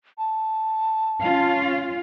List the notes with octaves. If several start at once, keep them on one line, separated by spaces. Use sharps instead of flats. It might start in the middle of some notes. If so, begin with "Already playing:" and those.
A5
C#4 F4 F5